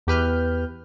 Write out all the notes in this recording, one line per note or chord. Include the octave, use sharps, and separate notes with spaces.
E2 G4 B4 F6 G6